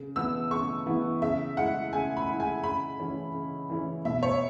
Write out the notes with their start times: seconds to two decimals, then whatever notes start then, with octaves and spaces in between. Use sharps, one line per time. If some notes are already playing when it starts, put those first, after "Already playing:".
Already playing: C#3
0.16 E3 B3 E4 E6
0.51 C#3 C#6
0.86 E3 B3 E4
1.22 C#3 E5
1.57 G#3 E4 F#5
1.93 C#3 G#5
2.17 B5
2.28 G#3 E4
2.40 G#5
2.63 C#3 B5
3.00 E3 C#4 E4
3.34 C#3
3.70 E3 C#4 E4
4.05 B2 E5
4.23 C#5